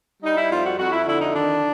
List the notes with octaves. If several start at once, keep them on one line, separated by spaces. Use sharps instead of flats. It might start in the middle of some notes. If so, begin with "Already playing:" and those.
G3 D#4
E4
F2 F4
F#4
F2 F#4
E4
D3 E4
D#4
D#3 D4